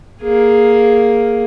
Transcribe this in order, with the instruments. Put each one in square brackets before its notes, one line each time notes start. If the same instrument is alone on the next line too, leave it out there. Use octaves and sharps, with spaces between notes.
[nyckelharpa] A#3 G#4